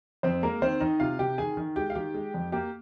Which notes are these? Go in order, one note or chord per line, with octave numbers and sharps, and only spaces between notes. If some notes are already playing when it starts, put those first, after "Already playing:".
F2 C4 C5
G#3 A#3 A#4
D#3 C4 C5
D#3 D#4 D#5
C3 F4 F5
C3 G4 G5
D#3 G#4 G#5
D#3
G#3 G4 G5
F5
D#3 G4 G5
G#3
F2
A#3 G4 G5